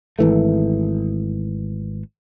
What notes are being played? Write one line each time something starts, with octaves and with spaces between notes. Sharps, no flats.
G#1 E3 A3